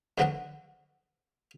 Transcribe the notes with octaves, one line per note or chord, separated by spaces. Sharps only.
F2 D3 F#3 B3 D4 F#5